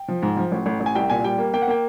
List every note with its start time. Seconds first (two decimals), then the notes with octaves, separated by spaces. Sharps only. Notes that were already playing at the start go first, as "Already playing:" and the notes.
Already playing: G5
0.08 F3
0.22 G#2
0.37 F3
0.52 A1
0.66 A1
0.80 A1
0.86 G#5
0.95 C2 G5
1.10 A#2 G#5
1.24 G3 G5
1.38 A#3
1.54 A#3 G5
1.62 F#5
1.68 A#3 G5